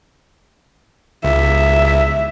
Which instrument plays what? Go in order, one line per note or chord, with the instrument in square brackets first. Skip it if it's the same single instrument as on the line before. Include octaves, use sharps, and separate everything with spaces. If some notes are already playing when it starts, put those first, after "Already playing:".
[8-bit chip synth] C#2 [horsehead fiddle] E5